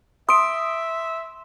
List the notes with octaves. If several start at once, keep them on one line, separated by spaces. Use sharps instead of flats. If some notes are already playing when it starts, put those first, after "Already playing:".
E5 C6 D#6 D7